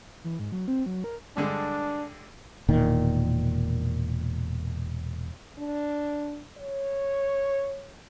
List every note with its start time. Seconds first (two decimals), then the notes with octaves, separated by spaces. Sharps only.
0.24 E3
0.39 G#2
0.52 F#3
0.68 C4
0.86 F#3
1.04 A#4
1.37 G2 D3 G#3 D4
2.68 E1 A#2 D#3
5.58 D4
6.58 C#5